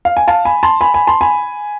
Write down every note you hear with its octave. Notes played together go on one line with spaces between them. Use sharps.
F5
G#5
F5 A5
G#5 B5
A5 C6
G#5 B5
G#5 B5
A5 C6
G#5 B5